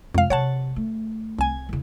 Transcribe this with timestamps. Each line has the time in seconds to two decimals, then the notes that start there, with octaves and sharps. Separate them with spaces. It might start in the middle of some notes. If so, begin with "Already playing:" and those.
0.15 F2 C3 G#3 F5
0.30 C3 F#3 C#5 F#5 A5
0.76 A3
1.39 C2 G#5
1.69 E2 C#3